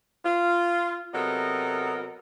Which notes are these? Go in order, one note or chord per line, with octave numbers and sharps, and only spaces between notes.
F4
C3 F#3 B3 A4 A#4 D#5